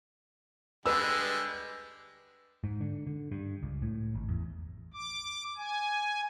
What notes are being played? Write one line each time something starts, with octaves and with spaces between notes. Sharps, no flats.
D3 G3 G#3 B4 E6
G#2
D3
D3
G2
C#2
A2
G#1
E2
D6
G#5